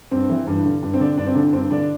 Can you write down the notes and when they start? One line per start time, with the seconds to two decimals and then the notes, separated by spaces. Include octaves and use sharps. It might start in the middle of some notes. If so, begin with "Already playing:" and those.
0.11 G2 C4
0.29 E3
0.47 G2
0.65 D3
0.83 G2
0.93 C4
1.00 D3 D4
1.17 G2 D4
1.26 C4
1.35 D3 D4
1.53 G2 C4
1.71 D3 D4